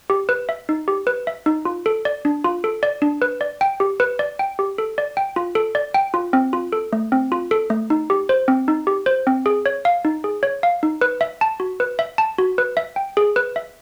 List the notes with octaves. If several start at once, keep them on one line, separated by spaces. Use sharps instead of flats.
G4
B4
E5
D#4
G4
B4
E5
D#4
F4
A4
D5
D4
F4
A4
D5
D4
B4
D5
G5
G4
B4
D5
G5
G4
A4
D5
G5
F4
A4
D5
G5
F4
C4
F4
A4
A3
C4
F4
A4
A3
D#4
G4
C5
C4
D#4
G4
C5
C4
G#4
C#5
F5
D#4
G#4
C#5
F5
D#4
B4
E5
A5
F#4
B4
E5
A5
F#4
B4
E5
G5
G#4
B4
E5